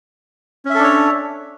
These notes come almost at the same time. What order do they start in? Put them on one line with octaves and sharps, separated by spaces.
C#4 E5 A4 D4 C#5